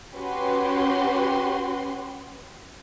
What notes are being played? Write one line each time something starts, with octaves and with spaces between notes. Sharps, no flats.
C#4 F#4 G4 B4 C6